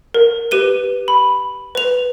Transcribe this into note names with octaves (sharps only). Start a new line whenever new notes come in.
A#4
G4 B4 D#7 G7
B5
B4 F7